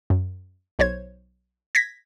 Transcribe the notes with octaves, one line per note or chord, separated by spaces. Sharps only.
F#2
B1 C5 C#5 G#6
G#6 A#6 B6